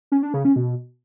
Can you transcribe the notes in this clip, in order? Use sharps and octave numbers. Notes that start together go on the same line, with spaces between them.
C#4
D4
C#3
C#4
B2